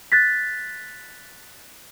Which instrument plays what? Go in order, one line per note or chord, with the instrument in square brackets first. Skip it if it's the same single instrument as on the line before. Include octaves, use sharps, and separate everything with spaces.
[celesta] F#6 A6 B6